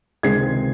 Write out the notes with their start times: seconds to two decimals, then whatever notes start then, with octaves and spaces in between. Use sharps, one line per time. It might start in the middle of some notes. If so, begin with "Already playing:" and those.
0.23 C#2 C3 D#3 G#3 C4 G#6 C7